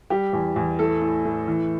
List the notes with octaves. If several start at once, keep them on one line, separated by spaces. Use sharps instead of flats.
G3 G4
E2
E2
A2 A4
A2
A2
E3